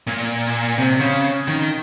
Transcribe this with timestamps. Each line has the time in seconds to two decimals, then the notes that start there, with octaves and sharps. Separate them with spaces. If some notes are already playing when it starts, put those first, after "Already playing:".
0.07 A#2
0.78 C3
1.01 C#3
1.48 D#3